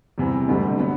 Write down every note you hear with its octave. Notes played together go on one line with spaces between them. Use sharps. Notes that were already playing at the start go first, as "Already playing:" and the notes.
E2 C3 E3 G3
E1 D2 C3 G3
D3 F#3 B3